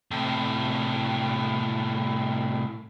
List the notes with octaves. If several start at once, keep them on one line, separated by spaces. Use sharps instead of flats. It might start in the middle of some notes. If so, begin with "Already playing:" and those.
A2 C3